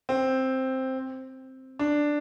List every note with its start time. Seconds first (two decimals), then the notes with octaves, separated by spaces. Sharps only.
0.09 C4
1.79 D4